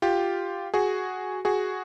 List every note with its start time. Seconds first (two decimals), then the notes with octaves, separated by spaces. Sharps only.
0.02 F4 G4
0.74 F#4 G#4
1.45 F#4 G#4